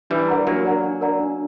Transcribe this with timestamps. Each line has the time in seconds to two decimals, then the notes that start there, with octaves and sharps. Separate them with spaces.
0.10 E3 G3 D4
0.28 A#4 D5 F#5 A#5
0.47 F#3 A#3 D4
0.65 A#4 D5 F#5 A#5
0.84 D4
1.01 A#4 D5 F#5 A#5
1.19 D4